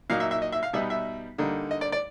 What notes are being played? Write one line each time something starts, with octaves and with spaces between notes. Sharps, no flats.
A#2 F#3 A#3 D#4 F5
E5
E5
D#5
E5
F5
B2 G3 B3 D#4 E5
E5
D3 G3 A#3 D#4
D#5
D5
D5